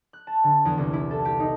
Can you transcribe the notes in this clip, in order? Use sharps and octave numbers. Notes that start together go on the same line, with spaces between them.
F#6
A5
D3
E2
C2
E4
A4
G4
D#4